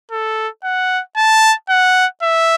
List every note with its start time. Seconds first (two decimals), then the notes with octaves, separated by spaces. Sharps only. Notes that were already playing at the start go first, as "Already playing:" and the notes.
0.11 A4
0.64 F#5
1.17 A5
1.69 F#5
2.22 E5